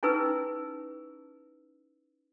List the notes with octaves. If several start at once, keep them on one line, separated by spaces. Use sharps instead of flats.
C#4 D#4 E4 G#4 B4 E6